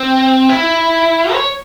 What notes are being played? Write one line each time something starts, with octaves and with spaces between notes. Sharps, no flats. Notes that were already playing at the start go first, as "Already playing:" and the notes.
Already playing: C4
E4
C#5